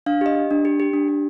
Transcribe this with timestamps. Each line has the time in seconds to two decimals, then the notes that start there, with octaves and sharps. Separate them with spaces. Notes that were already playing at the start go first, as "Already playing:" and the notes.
0.06 D4 F5
0.21 G4 D#5
0.35 G4
0.51 D4
0.65 G4
0.80 G4
0.93 D4
1.08 G4